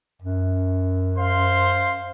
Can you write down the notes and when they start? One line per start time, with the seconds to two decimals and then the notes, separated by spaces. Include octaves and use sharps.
0.22 F#2
1.19 C5 F5 C6